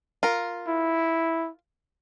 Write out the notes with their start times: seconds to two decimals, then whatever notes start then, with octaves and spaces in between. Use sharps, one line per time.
0.23 F4 A#4
0.68 E4